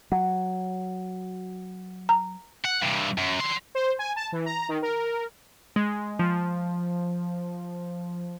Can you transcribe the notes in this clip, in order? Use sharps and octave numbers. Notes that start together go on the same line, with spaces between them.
F#3 F#5
A#5
F#5
G2 C3
F#2
D3 C6
C5
G#5
A5
E3
A#5
D#3
A#4
G#3
F3